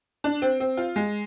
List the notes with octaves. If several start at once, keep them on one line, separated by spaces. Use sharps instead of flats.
D4
C4
C4
F4
G#3